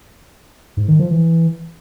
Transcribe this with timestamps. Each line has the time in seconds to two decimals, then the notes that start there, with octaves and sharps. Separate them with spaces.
0.77 G#2
0.88 D#3
0.99 F3
1.11 E3